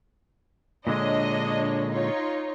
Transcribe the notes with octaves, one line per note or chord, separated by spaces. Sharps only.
A#2 D3 G#3 D4 C#5 D#5
D#4 F4 C#5